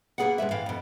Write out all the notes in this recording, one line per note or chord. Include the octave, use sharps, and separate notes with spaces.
B2 A#3 F4 G#4 B4 F#5
B2 G#3 B4 E5
A2 E3 F5 G5
F2 B2